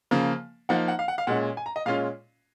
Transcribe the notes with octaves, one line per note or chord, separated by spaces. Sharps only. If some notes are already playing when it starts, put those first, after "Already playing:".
C#3 F3 A#3
F3 A#3 D#4 F#5
F#5
F5
F#5
F5
A#2 G#3 C#4 F#5
G#5
A#5
D#5
A#2 G#3 C#4 F4 F5